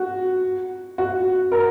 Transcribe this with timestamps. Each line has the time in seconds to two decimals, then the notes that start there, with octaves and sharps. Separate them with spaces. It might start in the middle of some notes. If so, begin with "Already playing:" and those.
Already playing: F#4
0.98 F#4
1.52 A#4